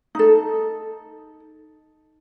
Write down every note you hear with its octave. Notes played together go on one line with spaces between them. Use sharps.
D#4 A4